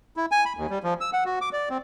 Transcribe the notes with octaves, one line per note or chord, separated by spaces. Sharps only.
E4
G#5
B5
D#2
G3
F3
E6
F#5
F#4
D6
D5
C4